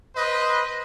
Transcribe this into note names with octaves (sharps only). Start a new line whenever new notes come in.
B4 C5 D#5